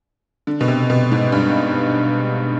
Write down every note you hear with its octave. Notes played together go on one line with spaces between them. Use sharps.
D3
B2
C3
B2
G#2
G2